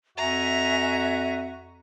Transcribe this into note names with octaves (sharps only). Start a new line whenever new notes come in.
F2 F#4 E5 G#5 A#5